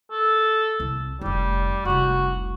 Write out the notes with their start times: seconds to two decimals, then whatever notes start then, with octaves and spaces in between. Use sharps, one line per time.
0.11 A4
0.80 C2
1.21 F1 G3 D#4
1.85 F1 C2 F#4